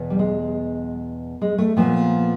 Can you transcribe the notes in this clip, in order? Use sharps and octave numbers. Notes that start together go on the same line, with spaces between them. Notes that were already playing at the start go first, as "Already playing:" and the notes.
Already playing: E2 B2
G3
G#3
G#3
A3
A#2 F3 B3